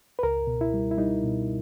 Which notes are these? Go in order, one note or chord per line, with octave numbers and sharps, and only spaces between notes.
B4
C#2 A#4
B2
E4
G3
E4
G3 D#4
B2